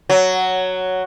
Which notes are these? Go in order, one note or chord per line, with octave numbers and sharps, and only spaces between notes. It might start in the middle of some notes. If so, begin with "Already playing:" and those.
F#3